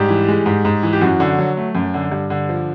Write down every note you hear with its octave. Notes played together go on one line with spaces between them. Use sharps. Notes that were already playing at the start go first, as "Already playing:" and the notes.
Already playing: G#2 G3 G4
E3
G#3
G#2
G#2
E3
G4
F#2 F#4
D3
F#3
A3
F#2
D3
G2
D3
F3